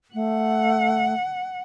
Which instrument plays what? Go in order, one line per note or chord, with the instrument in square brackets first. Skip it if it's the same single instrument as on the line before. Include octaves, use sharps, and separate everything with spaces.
[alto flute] A3 [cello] F#5